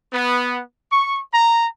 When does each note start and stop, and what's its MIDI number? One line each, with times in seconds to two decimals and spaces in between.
0.13 0.61 59
0.92 1.20 85
1.34 1.66 82